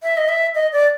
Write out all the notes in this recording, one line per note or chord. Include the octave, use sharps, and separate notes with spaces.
E5
D#5
E5
D#5
D5